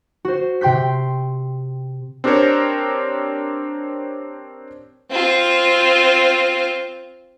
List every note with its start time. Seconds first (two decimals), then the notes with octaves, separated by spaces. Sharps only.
0.25 F#4 C5
0.61 C3 G5 C6 G6 B6
2.24 C4 D4 G4 A#4 C5 C#5
5.11 C4 F4